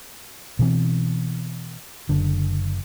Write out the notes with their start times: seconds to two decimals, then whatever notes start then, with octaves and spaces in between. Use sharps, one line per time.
0.59 B2 E3 C4
2.09 F#1 D3